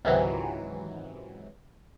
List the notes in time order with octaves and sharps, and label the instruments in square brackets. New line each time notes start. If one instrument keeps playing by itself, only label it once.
[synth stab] C#2 G#2 C3 D#3 E3 F#3